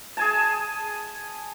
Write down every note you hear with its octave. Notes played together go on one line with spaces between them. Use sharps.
G#4 G#5 A5